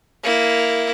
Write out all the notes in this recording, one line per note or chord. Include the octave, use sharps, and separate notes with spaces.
A#3 E4